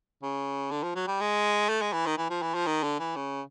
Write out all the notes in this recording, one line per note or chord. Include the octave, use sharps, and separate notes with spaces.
C#3
D3
F3
F#3
G3
G#3
A3
G#3
E3
D#3
E3
F3
E3
F3
D#3
D3
E3
C#3